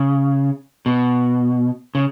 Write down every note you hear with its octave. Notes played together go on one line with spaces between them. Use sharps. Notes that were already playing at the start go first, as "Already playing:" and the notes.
Already playing: C#3
B2
C#3